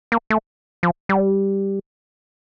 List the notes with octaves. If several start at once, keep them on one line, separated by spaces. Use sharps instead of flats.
A#3
A3
F3
G3